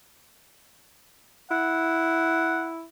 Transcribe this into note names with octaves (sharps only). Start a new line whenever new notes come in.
E4 F#5